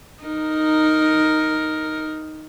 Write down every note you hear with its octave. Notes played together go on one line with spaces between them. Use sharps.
D#4 A#4